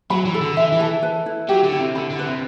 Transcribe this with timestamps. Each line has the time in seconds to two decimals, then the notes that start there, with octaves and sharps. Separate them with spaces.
0.10 F#3 B5
0.25 E3
0.34 A4
0.41 D3
0.57 E3 E5
0.72 E3
0.80 A4
1.03 B4
1.26 E4
1.49 F#3 G4
1.64 D3
1.72 E4
1.80 C3
1.95 D3 B5
2.10 D3
2.19 B4
2.26 C3